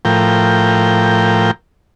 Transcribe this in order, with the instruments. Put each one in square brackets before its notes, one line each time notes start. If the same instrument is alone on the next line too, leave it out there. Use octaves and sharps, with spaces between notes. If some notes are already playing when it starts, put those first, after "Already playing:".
[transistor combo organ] A2 F3 A#4 G5